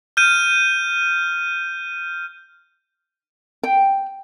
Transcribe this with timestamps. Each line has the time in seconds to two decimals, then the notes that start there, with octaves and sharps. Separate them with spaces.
0.17 F6 G6 D#7
3.63 G5